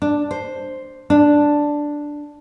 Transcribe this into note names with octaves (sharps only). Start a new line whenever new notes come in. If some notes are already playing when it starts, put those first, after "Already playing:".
D4
C5
D4